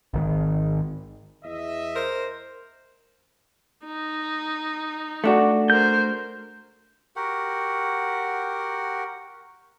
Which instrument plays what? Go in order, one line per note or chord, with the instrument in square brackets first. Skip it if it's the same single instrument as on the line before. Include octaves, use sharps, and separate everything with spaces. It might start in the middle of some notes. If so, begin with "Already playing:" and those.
[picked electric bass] G#1 D#3
[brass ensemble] E2 D#5 E5
[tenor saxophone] A#4 [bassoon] C5
[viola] D#4
[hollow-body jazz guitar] A3 D4 F#4
[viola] A#4 C5 [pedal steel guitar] G6
[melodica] F#4 G4 A#4 F#5